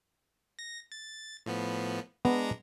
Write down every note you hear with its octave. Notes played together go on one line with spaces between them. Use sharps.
A#6
A6
A2 F3 B3
G#3 B3 D4 A#5